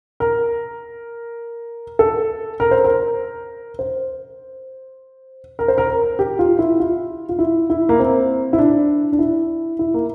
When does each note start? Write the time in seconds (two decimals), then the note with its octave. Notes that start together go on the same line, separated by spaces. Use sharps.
0.20 A#4
1.99 A4
2.60 A#4
2.71 C5
2.84 A#4
3.79 C5
5.59 A#4
5.68 C5
5.78 A#4
5.90 A#4
6.19 G4
6.39 F4
6.59 E4
6.80 F4
7.29 F4
7.39 E4
7.70 E4
7.89 A#3
8.00 C4
8.53 E4
8.59 D4
9.12 D4
9.19 E4
9.79 E4
9.94 A#3